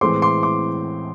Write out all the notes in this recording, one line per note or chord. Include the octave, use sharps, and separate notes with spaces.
A2 E3 G#3 C4 C6 D6
C6 D6
C6 D6